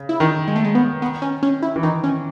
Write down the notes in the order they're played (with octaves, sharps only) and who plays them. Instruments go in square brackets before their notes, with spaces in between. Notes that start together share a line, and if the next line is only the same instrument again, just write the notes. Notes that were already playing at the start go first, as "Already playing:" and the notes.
Already playing: [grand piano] C#3
[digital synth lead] E4
[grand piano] D#3 [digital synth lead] D#4
[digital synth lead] G#3
A3
G#3
B3
B3
C#4
C#4
E4
[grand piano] E3
[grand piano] D#3 [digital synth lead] D#4
[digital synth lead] C#4